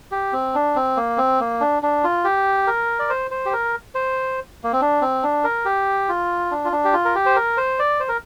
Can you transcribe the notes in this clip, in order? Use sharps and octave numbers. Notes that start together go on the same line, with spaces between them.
G4
C4
D4
C4
A#3
C4
A#3
D4
D4
F4
G4
A#4
D5
C5
C5
G4
A#4
C5
A#3
C4
D4
C4
D4
A#4
G4
F4
D4
F4
D4
G4
F4
A#4
G4
C5
A#4
C5
D5
C5
A#4